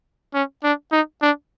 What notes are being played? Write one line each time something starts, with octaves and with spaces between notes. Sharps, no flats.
C#4
D4
D#4
D4